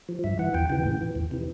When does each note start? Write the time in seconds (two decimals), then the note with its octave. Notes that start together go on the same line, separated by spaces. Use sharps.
0.09 F3
0.24 G2 E5
0.39 E3 F#5
0.54 E2 G5
0.70 C#3 E3 G5
0.85 A2
1.01 E3
1.15 E2
1.31 C3 E3